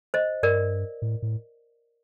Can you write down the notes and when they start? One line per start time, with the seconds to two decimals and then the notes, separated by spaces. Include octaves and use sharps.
0.14 C5 D#5
0.43 G2 A#4 D5
1.02 A2
1.22 A2